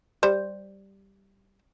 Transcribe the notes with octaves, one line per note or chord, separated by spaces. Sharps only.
G3 C5